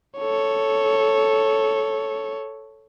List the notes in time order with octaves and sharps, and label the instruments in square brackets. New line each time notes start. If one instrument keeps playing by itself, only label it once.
[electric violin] A4 C#5